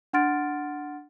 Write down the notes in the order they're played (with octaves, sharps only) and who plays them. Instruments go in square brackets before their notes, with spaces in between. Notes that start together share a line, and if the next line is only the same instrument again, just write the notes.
[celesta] D4 F#5 C6 F6 A6 D7